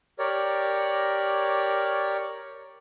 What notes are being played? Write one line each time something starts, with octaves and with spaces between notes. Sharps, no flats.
G4 A#4 C#5 D5